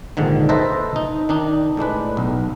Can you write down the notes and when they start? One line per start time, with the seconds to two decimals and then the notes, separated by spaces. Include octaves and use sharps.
0.17 A#1 G#2 D3 D#3
0.49 A4 B4 C5 D#5 E5 A#5
0.96 D#4
1.29 D#3 D4 D#4
1.77 A2 G#3 D4 B4
2.17 B1